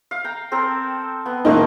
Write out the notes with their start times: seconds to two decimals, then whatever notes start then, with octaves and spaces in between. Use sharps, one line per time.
0.11 F5
0.24 G5 A#5
0.52 C4 A4 A#4
1.26 B3
1.45 D#3 F3 A3 A#3 D#4 B4